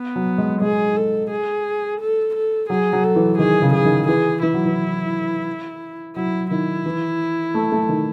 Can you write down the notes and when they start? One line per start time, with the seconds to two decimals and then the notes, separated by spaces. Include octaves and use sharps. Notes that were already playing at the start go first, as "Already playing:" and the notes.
Already playing: B3
0.16 F#3
0.38 G#3
0.62 G#3 G#4
0.96 A4
1.31 G#4
2.00 A4
2.35 A4
2.70 F#3 G#4
2.93 F#3
3.04 A4
3.16 E3
3.38 D#3 G#4
3.62 C#3
3.73 G#4
3.85 D#3
4.08 E3 G#4
4.42 E3 E4
4.54 F#3
4.66 E3
6.15 F#3 E4
6.50 D#3 E4
6.86 E3
7.54 A3
7.72 A3
7.89 D#3